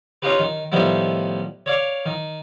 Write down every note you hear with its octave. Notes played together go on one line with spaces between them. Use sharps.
C#4 D#4 F4 G4 B4
D#3
A2 D#3 F3 G3 B3 E4
C#5 D5 F5
D#3